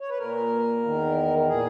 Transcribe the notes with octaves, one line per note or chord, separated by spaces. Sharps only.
C#5
B4
A#2 A#4
E2 D#3
A#2 G#4